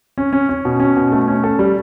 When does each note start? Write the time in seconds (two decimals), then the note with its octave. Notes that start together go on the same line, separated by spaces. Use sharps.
0.18 C#4
0.33 C#4
0.49 C#4
0.65 B2
0.80 C#4
0.97 B2
1.12 A3
1.28 C#4
1.44 A4
1.59 G3